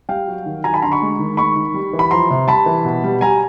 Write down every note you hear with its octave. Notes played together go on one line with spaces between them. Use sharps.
G3 F5 G5
F#3
D#3
F#3 G#5 A#5
A5 B5
D3 A#5 C6
B5 C#6
G#3
D#3
G#3 B5 C#6
D#3
G3
E3
B5
F3 A#5 C6
C3
G3 A5 B5
E3
B2
G3
G3 G#5 A#5